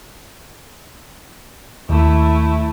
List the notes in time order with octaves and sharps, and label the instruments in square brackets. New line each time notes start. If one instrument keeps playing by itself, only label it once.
[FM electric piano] D#2 [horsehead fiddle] A3 E4